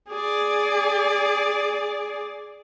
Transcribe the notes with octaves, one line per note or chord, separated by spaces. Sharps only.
G#4 D5